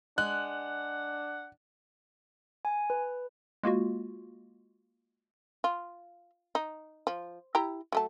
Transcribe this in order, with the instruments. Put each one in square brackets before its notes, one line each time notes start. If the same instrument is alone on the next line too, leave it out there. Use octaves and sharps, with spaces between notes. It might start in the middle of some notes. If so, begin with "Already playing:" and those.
[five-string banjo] G#3 [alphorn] D4 [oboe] F#5 [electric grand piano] F#6
[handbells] G#5
B4
[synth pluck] G#3 A#3 F4 F#4
[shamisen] F4
D#4
F3
E4 G4 A#5
F#3 A3 A5